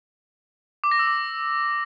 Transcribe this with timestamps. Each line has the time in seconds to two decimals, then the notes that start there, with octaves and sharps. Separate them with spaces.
0.84 D6
0.91 A#6
0.99 E6
1.07 D6